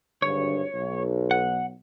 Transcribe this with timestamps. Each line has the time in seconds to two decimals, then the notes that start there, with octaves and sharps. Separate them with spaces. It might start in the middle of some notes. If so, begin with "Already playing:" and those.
0.22 G#1 G2 D3 C#5
0.74 B1
1.31 F#5